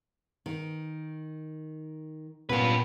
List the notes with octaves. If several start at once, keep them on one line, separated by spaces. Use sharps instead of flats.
D#3
A#2 B3 C#4 F4 G4 B4